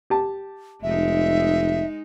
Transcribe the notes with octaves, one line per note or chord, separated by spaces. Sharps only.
G4 A5
F1 G#3 D#4 E5